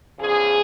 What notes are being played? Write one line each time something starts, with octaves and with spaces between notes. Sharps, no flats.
E2 C#3 F3 G#4